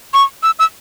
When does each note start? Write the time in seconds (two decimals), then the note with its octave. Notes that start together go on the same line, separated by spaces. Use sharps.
0.14 C#6
0.43 E6
0.59 E6